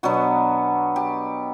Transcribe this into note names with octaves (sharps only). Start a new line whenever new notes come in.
B2 F#3 B3 D4 F#4
G4